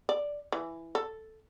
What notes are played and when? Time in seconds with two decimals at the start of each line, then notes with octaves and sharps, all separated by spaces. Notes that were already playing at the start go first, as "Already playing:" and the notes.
0.09 D5
0.52 E3
0.95 A4